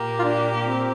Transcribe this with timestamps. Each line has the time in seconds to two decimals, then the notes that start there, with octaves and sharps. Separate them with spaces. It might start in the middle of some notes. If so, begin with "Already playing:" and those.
Already playing: A#2 A#3 G4
0.19 F4
0.24 D4
0.62 C4